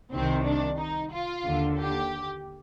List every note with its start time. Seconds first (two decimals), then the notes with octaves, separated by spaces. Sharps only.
0.11 C2 C3 D#3 C4
0.45 D4
0.78 D#4
1.12 F4
1.45 D#2 D3
1.78 G4